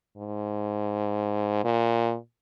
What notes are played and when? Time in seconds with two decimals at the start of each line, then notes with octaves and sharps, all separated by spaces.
0.18 G#2
1.64 A#2